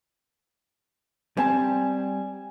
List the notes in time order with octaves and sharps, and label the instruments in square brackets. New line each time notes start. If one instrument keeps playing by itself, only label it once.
[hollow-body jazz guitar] G3 C4 A5 [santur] G#5